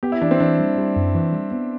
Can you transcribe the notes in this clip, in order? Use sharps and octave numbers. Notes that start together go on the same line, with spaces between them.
B3 G4
E4
E3 D4
C4
E3 D4
G3
G3
F#2
E3
G3
B3